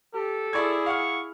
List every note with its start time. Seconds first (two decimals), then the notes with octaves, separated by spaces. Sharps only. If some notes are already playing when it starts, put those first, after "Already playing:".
0.15 G4 A4
0.53 E4 G#4 D5 C#6 G#6
0.86 F5 F#5 C#6 F6